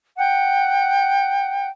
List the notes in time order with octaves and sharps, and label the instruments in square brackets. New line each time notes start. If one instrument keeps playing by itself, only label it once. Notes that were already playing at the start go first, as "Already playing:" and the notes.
[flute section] F#5 G5